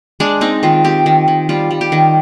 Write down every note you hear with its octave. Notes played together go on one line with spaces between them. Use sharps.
G#3 D4
C4 D#4
D#3 F4
C4 G4
D#3
D#3
G3 F4
G3
G4
D#3